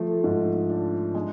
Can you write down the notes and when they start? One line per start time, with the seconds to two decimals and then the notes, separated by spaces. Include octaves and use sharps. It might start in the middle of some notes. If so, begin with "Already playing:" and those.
Already playing: F3 A3
0.24 G#2
0.69 D4
1.15 G#3